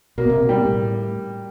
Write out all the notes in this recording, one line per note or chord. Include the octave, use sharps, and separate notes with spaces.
B2 A#3
C3
B2
G3
A2